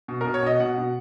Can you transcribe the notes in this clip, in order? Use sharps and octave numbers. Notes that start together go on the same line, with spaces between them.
B2
B2 A#4
C#5
B2 D#5
B2 F#5
B2